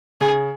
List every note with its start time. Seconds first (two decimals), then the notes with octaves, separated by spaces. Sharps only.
0.21 C#3 G#4